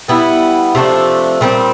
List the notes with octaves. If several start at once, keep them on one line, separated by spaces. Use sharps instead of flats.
G3 B3 E4
C3 F3 A3 D4
A#2 G3 C4